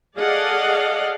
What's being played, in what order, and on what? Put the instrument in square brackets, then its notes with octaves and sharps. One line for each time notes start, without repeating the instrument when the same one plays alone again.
[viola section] G#4 A4 D5 D#5 F5 F#5